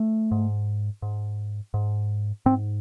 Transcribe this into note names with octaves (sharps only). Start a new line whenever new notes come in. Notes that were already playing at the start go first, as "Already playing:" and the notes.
Already playing: A3
G#2
G#2
G#2
G#2 C4